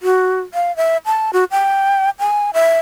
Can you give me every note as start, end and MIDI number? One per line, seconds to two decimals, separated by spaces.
0.02 0.39 66
0.54 0.75 77
0.77 0.97 76
1.06 1.31 81
1.33 1.44 66
1.51 2.10 79
2.19 2.51 80
2.54 2.80 76